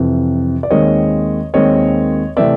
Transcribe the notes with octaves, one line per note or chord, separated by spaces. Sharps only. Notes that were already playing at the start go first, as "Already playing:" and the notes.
Already playing: F2 C3 E3
D5
D#2 D#3 G#3 C4 C#5 D#5
D#2 D#3 G#3 C4 C#5 D#5
C3 E3 A3 C4 D5 E5